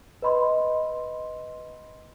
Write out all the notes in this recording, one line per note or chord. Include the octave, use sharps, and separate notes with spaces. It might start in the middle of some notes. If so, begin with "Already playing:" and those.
B4 D#5 B5 C6